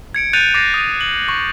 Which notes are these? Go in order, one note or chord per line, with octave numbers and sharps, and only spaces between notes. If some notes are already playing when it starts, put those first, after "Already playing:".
G#6 C#7 D7
F#6 G6 A6 C#7 D#7 F7
D6 A6 A#6 C7
D#6 D#7
F#7
C#6